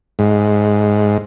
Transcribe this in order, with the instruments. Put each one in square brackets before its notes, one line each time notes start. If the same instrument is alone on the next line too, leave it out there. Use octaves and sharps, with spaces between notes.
[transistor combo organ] G#2